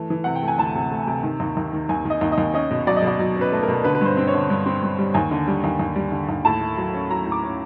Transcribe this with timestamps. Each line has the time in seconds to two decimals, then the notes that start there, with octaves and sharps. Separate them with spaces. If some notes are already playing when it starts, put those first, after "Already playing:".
Already playing: E3 A3
0.10 E3
0.24 C3 F#5
0.35 G5
0.42 A3
0.48 G#5
0.58 D2 A5
0.75 C3
0.91 A3
1.07 C3
1.23 D#3
1.40 D#2
1.57 D#2
1.73 D#3
1.89 D#2 G#5
2.05 D#3 D#5
2.21 D#2
2.32 D#5
2.38 D#2
2.54 C#4 D#5
2.71 B2
2.87 F#3 D5
2.96 D#5
3.02 B2 D5
3.19 F#3
3.36 C#4
3.41 B4
3.52 A3
3.63 A#4
3.68 B2
3.84 D3 B4
3.95 B4
4.01 G2 C5
4.17 C4
4.27 C#5
4.34 D3
4.50 G2
4.66 C4
4.82 G2
4.98 G3
5.14 D#2 G#5
5.31 D3
5.48 G3
5.64 D#2
5.79 D#2
5.96 G3
6.12 D3
6.29 D#2
6.45 A2 A5
6.61 A3
6.77 F#3
6.93 C#4
7.10 F#3 A#5
7.26 A2
7.32 D6
7.43 C#4